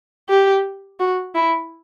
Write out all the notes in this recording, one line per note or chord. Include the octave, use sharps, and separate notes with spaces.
G4
F#4
E4